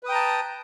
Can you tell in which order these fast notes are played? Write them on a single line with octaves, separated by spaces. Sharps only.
B4 D#6 G5 A#5 A5